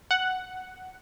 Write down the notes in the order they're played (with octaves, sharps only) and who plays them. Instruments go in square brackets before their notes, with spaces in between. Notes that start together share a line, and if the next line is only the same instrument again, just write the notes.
[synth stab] F#5